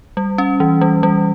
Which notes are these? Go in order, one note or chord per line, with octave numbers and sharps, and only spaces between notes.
G3
C#4
E3
G3
G3